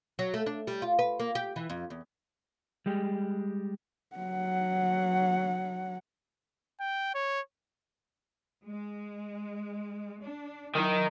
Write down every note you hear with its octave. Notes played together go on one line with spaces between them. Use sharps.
F#3
A3
D4
G3
F4
B4
A#3
G4
E3
F2
E2
G3 G#3 G4
F#3 F#5
G5
C#5
G#3
D4
D#3 F#3 D#4 E4